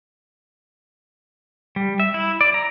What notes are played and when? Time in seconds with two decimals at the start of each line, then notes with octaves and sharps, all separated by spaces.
1.76 G3
2.00 E5
2.14 E4
2.41 D5
2.54 A#5